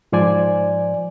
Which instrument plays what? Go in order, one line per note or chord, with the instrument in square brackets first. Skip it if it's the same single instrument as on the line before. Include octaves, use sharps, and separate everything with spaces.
[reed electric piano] G#2 F3 C5 D5 G#5